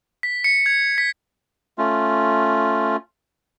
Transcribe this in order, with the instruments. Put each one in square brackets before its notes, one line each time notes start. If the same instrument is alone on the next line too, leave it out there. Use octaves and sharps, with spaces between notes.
[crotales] B6
C#7
G#6
B6
[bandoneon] A3 C#4 F4